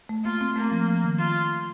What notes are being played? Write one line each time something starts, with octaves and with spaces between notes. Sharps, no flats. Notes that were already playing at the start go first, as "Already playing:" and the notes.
A3
A#3 F4
C4
A3 A#3
F3
F3
D#3
F4